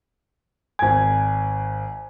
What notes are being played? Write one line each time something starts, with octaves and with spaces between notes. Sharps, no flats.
G#1 G#5 G#6